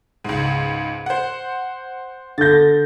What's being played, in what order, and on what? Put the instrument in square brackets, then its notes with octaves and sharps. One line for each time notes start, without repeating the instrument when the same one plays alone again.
[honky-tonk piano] C#2 G#2
C5 F#5
[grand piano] D3 G6 [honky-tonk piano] A6 A#6